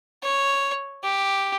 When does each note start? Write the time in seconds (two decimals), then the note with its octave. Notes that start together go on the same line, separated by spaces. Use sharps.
0.23 C#5
1.03 G4